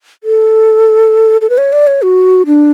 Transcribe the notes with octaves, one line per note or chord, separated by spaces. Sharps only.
A4
A4
B4
C#5
D5
C#5
F#4
D4